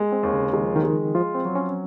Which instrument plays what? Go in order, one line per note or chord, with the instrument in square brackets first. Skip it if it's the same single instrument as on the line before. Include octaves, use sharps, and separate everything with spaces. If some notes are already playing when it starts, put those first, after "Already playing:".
Already playing: [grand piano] G#3
[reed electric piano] C4
[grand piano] D#2
[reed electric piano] C#3
[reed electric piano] D#3 [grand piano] G#3
[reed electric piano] F3
D#3
[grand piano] G#3
[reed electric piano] F3 [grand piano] F4
[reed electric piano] C4
[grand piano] F#3
[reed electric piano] C#4